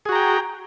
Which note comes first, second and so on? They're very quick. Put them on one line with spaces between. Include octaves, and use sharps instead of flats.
G#4 F#4 A#5 G5